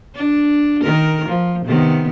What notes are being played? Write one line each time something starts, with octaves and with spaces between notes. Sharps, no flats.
D4
D#3 A#4
F3
C3 D#3 B3